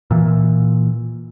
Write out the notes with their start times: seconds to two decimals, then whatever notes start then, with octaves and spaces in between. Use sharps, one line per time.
0.11 A#2 E3